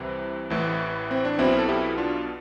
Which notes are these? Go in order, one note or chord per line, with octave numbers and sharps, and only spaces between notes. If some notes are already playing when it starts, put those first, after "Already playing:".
Already playing: C2 C3 E3 C4
A1 A2 E3
C4
D4
B1 B2 C4 E4
A4
E4 G4
D4 F4